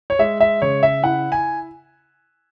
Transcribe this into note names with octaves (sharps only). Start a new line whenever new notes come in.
C#5
G#3 E5
E5
C#3 C#5
E5
E4 F#5
G#5